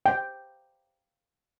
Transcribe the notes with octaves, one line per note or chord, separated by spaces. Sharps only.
G5